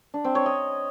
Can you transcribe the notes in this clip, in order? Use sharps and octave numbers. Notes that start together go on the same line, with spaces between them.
D4
C4
C#5
D#5